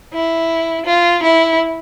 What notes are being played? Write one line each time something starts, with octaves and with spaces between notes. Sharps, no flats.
E4
F4
E4